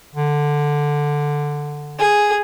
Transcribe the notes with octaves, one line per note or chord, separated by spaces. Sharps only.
D3
G#4